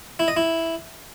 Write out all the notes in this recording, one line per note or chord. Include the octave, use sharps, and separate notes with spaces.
E4
D#5
E4